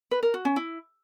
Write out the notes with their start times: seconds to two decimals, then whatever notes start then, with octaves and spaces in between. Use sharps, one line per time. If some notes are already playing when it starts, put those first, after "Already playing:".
0.11 B4
0.23 A#4
0.34 F#4
0.45 C#4
0.56 E4